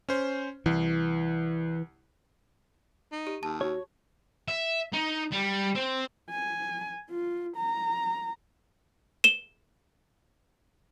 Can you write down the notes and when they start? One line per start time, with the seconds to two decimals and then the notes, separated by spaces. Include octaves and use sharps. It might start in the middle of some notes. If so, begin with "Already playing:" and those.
0.09 C#4 C5
0.66 C2 E3
3.12 D#4
3.27 G4
3.43 D#2 A5
3.61 F#4 C#5
4.48 E5
4.93 D#4
5.32 G3
5.75 C4
6.31 G#5
7.10 F4
7.57 A#5
9.24 E7 G7